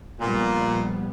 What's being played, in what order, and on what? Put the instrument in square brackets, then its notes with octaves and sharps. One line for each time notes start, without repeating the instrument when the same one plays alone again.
[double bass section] A#1 G3 B3 [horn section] A#2